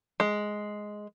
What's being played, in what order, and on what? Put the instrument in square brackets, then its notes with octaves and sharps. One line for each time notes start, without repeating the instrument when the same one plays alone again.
[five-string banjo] G#3